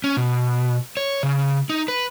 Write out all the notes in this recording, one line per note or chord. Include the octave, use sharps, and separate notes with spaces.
C#4
B2
C#5
C#3
D#4
B4